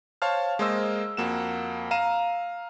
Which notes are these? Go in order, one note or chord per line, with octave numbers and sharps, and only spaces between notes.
C5 C#5 F5 A5 F6
G#3 A#3 C5 D#5 E6
F2 A#3 F#4 E7
F5 A#5 D#7 E7